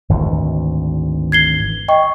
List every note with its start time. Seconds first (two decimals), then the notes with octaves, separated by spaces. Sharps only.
0.09 G#1 D2 E3
1.32 G#6 C7 G7
1.88 D#5 G5 C#6